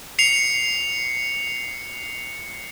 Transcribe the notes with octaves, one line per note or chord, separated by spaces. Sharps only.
C7 C#7 F7